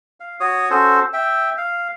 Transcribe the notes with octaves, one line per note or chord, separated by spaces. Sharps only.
F5
F#4 C#5 D#6
C#4 F#4 A4 C5
E5 G5
F5